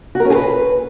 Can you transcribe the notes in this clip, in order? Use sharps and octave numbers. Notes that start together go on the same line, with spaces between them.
F#4
A#4
C#4
G#4
B4